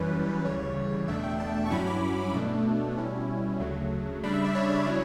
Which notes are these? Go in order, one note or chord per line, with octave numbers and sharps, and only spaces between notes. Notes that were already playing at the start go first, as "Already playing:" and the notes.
Already playing: F#2 E3 G3 C#4 B4
D2 C#3 E3 G3 C#5
E2 B2 A3 D4 E5
G5
A5
C#6
G2 F#3 C#4 E4 B5
D6
B2 A3 D4
B2 G3 C#4 E4
D2 C#3 F#3 A3
C#3 G3 D4 B5
E5
D5
C#5
C#3 F#3 C#4 E4